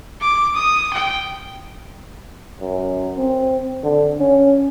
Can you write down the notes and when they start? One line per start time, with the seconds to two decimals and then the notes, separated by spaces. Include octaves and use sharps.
0.21 D6
0.55 D#6
0.93 G5
2.60 F#2
3.17 C4
3.83 D3
4.20 C#4